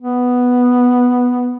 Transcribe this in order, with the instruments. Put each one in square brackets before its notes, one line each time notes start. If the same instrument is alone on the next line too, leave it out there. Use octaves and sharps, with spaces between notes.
[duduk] B3